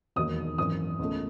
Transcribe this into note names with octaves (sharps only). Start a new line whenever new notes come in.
E1 D#2 D#3 F#3 D#6
G#1 F#2 E3 D#6
C#2 B2 A3